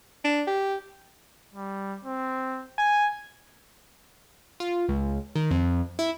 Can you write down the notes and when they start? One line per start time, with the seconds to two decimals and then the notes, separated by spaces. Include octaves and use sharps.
0.24 D4
0.47 G4
1.54 G3
2.05 C4
2.78 G#5
4.60 F4
4.89 C#2
5.35 D#3
5.51 F2
5.99 E4